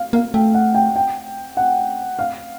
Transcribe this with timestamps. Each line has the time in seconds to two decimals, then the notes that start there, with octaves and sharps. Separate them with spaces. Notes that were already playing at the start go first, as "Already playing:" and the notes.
Already playing: F5
0.13 A#3 F5
0.34 A3 G5
0.54 F#5
0.75 G5
0.96 G5
1.57 F#5
2.19 F5